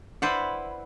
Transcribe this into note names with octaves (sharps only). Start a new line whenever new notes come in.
E4 B4 C5 D5 F#5